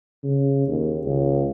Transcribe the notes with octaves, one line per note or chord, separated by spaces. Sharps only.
C#3
D#2
C#2